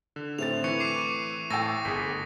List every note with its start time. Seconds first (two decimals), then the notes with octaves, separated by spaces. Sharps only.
0.16 D3
0.38 A2 C4 A6 F7
0.64 E3 C#6 C#7
0.80 D6 C7 D#7
1.50 A2 G5 A5 E6 A#6
1.85 G1 G#4 B6